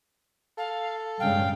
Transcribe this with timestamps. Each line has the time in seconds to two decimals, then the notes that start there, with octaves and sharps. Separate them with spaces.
0.58 A4 F5
1.20 G2 C#3 G#3 F5 G5